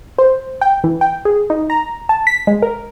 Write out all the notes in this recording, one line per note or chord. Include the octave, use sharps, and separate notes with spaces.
C5
G5
E3
G5
G#4
D#4
A#5
A5
B6
G#3
A#4